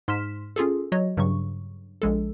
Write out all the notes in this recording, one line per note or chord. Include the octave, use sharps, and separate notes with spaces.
G#2 C6 F6 B6 E7
C#4 F4 G#4 A4
F#3 F#4 C#5 D#5
G2 C#3 F#3 C#6
A#1 G#3 A4